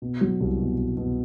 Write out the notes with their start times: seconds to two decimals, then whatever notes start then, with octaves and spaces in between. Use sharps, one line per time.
0.02 B2
0.21 F#3
0.41 C2
0.59 B2
0.78 B2
0.97 B2